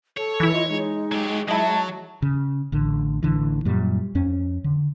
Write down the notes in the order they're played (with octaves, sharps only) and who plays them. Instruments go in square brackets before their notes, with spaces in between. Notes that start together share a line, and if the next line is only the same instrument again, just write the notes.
[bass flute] A4 [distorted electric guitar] C#5
[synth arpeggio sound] E3 E4
[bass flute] F4 [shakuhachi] D#5
[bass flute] G#3 [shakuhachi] D#4
[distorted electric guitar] F#3 G4
[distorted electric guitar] F#3 [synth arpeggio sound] D#4 E4 [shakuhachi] A5
[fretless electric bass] C#3
A1 D3
A1 D3 E3
F#2 A#2 G3
F2 C#4
D3